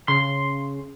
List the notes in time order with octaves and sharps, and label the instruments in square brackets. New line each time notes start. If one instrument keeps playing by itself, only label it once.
[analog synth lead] C#3 [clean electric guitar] C6